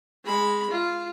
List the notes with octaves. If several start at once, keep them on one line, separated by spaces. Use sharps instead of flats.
G#3 B5
F4